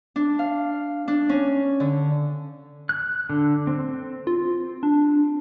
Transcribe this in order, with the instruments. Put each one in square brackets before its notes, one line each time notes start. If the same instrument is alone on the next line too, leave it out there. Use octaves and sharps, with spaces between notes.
[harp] D4
F5
D4
C#4
D3
[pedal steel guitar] F#6
D3
C4
[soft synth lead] F4
D4